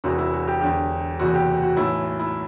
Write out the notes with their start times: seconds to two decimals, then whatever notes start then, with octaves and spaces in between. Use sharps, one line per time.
0.04 E1 E2 C3 E3 F#4
0.18 E4
0.33 F#4
0.48 G4
0.61 E1 E2 D3 G4
1.19 F#1 E2 C3 E3 F#4
1.34 G4
1.62 F#4
1.77 B1 A2 E3 E4
2.19 E4